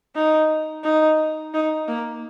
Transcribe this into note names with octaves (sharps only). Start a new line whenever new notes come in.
D#4
D#4
D#4
A#3